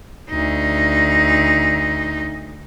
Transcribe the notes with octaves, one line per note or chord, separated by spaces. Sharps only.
D2 D#4